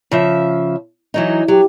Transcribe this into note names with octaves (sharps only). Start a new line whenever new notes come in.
C#3 F3 E5
E3 F#3 D#4
F#3 G4